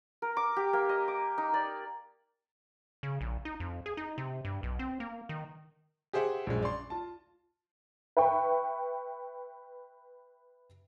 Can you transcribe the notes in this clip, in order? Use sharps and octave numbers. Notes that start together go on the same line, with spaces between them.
A#4
D6
G4
A#3
D#5
D6
D#4
D5
C#3
A#1
D#4
F2
G#4
D#4
C3
G2
B1
C4
A#3
D#3
G4 G#4 C5 E5 F#5
A#1 F#2 G#3
D5 C6
F4 A5
B4 E5 G5 C#6